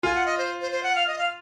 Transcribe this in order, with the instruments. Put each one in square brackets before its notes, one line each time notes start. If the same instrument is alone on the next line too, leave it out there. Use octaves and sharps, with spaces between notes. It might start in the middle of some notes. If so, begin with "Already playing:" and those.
[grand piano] F4 [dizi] G#5
[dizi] F#5
D#5
C5
C5
C5
F#5
F5
D#5
F5